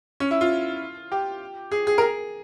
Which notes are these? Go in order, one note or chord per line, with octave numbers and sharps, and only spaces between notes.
C#4
E4
F4
G4
G#4
G#4
A#4
G#4